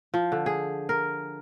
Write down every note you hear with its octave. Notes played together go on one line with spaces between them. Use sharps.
F3
D3
G#4
A#4